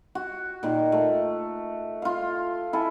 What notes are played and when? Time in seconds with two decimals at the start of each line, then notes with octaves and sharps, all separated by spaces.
0.15 F#4
0.63 A#2 D#3 A#4
0.92 A3
2.02 F4 F5
2.73 E4 A4 G#5